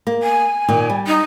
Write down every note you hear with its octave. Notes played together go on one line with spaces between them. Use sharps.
A#3
G#5
A#2 D#3
G3
D#4